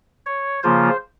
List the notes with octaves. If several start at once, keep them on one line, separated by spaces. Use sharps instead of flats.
C#5
C#3 F3 A#3 F4 C5